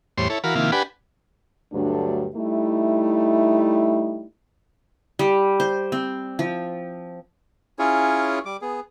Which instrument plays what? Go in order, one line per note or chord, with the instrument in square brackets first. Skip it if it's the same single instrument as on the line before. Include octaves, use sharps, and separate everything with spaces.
[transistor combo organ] E2 A2 G3 C5 C#5 C6
E4 A4 C#5
E3 F#4 A#4 F5 B5
C3 D#3 F3 A#3 E4 F5
D4 G4 B4 F#5 G#5 B5
[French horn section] D2 G2 F#3 A3 D4
G3 A3 D#4 E4
[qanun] G3
C5
C4
F3
[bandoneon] C#4 E4 F4 G#4 C#5
G3 D6
B3 G#4